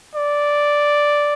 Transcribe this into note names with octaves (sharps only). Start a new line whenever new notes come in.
D5